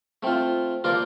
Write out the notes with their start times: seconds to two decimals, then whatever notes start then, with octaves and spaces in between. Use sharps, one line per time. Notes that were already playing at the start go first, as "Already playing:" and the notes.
0.23 A3 C4 F4
0.84 F3 A#3 F4 A#4 D5